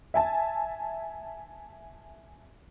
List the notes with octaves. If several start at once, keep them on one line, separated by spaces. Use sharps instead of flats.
E5 G#5 A5